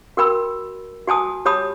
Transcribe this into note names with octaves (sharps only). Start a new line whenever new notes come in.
F#4 A#4 G5 B5 E6
F#4 G#5 A5 D#6
G4 C#5 A5 B5 D#6